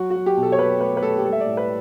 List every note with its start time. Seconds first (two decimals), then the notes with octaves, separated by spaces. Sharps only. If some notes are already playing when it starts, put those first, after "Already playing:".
Already playing: F#3 F#4
0.10 F#3 F#4
0.26 G4
0.37 B2
0.43 A4
0.52 C#5
0.59 F#3 B4
0.81 A3 B4
0.97 B4
1.02 A3 A4
1.18 G4
1.24 G3 A4
1.33 E5
1.41 D5
1.46 A2
1.57 B4